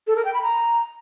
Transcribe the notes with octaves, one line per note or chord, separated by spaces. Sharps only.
A4
A#4
G5
B5
A#5